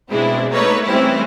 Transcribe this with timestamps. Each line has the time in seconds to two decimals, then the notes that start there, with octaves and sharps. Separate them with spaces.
0.10 B2 G#3 C4 D4 E4
0.51 A3 A#3 D#4 A4 B4 C#5
0.85 E3 G3 A3 C4 C#4 E4